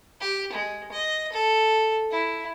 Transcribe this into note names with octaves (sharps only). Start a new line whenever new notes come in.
G4
G#3
D#5
A4
E4